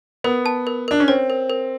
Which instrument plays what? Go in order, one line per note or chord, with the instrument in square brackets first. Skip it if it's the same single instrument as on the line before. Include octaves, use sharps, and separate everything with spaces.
[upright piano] B3 [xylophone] A#4
[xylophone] A5
A#4
[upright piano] D4 [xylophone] A#4
[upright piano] C#4
[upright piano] C4 [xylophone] C#5
[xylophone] A#4
A#4